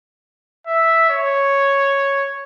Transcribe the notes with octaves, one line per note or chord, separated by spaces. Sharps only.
E5
C#5